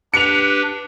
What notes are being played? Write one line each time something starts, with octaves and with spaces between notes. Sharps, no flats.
D4 G4 B4 C#7 F7